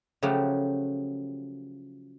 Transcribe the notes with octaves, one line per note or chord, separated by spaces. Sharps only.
C#3 F3 F#3 A3 G4 F#5